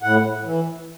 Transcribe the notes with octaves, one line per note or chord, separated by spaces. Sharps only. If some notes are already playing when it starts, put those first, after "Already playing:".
A2 F#5
E3